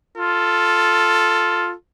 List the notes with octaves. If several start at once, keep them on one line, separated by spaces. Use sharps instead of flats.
F4 A4